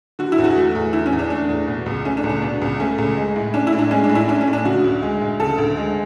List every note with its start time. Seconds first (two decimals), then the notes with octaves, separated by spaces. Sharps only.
0.19 D3 F#4
0.32 E4
0.38 E2
0.44 F#4
0.56 A3
0.75 E2
0.93 D3 E4
1.06 C#4
1.12 E2
1.19 D4
1.30 A3 D4
1.49 E2
1.67 B2
1.86 C#2
2.05 A3 C#4
2.17 D4
2.24 C#2
2.29 D4
2.42 B2
2.62 C#2
2.80 A3 C#4
2.98 C#2
3.17 G#3
3.36 A2
3.54 C#4 D4
3.67 E4
3.73 A2
3.79 D4
3.91 G#3 C#4
4.04 D4
4.09 A2
4.15 E4
4.28 C#4 D4
4.41 C#4
4.48 A2
4.53 D4
4.65 C#3 F#4
4.84 D2
5.02 G#3
5.22 D2
5.40 C#3 A4
5.58 D2
5.77 G#3